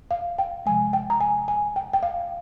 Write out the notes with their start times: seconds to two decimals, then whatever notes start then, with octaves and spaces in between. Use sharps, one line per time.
0.11 F5
0.39 G5
0.66 C3 F3 G#3 G#5
0.93 G5
1.10 A#5
1.21 G#5
1.48 G#5
1.76 G5
1.93 G5
2.03 F5